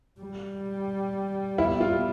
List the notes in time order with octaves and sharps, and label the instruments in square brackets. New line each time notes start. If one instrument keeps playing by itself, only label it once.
[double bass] G3
[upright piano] E4
F4